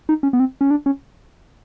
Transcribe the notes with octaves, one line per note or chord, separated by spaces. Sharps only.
D#4
C#4
B3
C4
C#4
D4
C#4